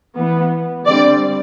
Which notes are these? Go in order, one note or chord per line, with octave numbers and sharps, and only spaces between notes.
E3 B3
D3 G3 C4 D5